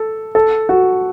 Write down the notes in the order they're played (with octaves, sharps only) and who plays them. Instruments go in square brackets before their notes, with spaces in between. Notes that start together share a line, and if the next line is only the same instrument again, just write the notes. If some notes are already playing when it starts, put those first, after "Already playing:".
Already playing: [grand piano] A4
A4
F#4